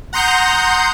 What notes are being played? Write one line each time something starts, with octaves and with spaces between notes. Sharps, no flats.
F#5 A#5 C6 D#6 G6 C7